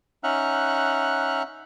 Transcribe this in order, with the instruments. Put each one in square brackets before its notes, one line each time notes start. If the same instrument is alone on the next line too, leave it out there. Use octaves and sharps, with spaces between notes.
[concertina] C#4 D#4 E5 F#5 F6 F#6